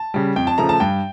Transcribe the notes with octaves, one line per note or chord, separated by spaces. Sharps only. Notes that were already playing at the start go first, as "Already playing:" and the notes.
Already playing: A5
C#3 G3
F2 G5
A5
C#3 F3 A3 A#5
A5
G2 G5